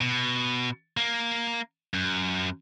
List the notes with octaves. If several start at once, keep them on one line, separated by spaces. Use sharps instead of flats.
B2
A#3
F#2